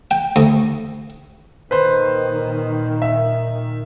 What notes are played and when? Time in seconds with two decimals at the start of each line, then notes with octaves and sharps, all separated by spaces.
0.11 G5
0.36 D2
1.71 A#2 D#3 B4 C5
3.02 E5